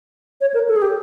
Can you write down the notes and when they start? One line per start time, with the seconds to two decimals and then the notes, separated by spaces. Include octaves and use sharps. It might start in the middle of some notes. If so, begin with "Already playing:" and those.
0.41 C#5
0.54 A#4
0.69 A4
0.76 G#4
0.82 G4